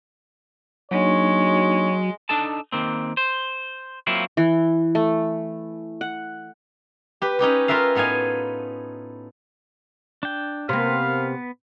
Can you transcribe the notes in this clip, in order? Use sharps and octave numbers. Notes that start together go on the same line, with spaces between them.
F#3 G#3 A#3 D4 D#4 C#5
D4 D#4 A4 A5
D#3 A#3 C4
C5
F#3 A#3 C4 E4 F4
E3
A3
F#5
G4 B4
C#4 D#4 G4 B4
F4 A#4 B4 E5 F5
A2 B3 D#4 F5 G#5
D4 G5
C3 A#3 B3 B4 F5